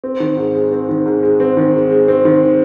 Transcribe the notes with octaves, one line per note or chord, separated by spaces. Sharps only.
C4
D#3
G#2
G#3
C4
D#3
G#2
G#3
C4
D#3
G#2
G#3
C4
D#3